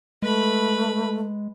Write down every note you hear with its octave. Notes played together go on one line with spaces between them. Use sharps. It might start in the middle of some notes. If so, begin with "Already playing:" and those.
G#3 A3 B4 B5